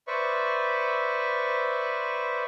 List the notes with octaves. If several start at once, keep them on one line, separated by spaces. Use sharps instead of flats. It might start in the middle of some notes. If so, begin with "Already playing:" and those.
B4 C5 D5 E5 C#6